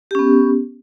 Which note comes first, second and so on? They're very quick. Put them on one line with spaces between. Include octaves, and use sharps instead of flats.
G4 C#4 B3